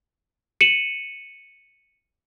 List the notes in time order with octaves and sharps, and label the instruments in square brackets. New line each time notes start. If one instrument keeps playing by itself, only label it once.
[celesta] C#7 D#7 E7 F#7